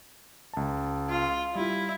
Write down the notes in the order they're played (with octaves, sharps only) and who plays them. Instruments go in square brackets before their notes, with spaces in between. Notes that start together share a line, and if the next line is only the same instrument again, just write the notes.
[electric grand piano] C#2 A5
[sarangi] F4
[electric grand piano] G3 F4 [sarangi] E4